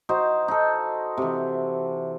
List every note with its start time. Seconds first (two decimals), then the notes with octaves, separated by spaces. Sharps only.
0.09 D#4 F#4 C5
0.48 D#4 A4
1.17 C3 E3